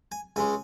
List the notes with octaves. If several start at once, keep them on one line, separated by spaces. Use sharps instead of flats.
G#5
C#2 C#3 G#3 G#5